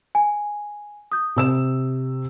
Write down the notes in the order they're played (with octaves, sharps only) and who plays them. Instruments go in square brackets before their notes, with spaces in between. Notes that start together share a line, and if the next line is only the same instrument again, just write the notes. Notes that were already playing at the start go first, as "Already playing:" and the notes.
[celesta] G#5
D#6 G6
[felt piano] C3 E6 E7